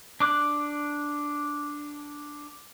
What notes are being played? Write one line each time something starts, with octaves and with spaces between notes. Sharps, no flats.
D4 D6 F#6